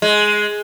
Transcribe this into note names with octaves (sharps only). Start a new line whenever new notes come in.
G#3